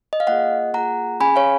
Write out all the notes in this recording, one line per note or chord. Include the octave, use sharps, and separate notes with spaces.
D#5
F5
A#3 F4 G#4 D#5 F#5
A#3 F4 G#4 F#5 A#5
C#4 G#4 G#5 B5
C#5 F5